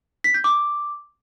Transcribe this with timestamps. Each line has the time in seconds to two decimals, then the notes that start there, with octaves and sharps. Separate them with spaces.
0.24 B6
0.34 G6
0.44 D6